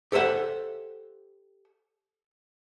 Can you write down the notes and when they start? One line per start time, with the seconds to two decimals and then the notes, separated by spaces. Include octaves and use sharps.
0.12 G4 A4 C5 E5 F#5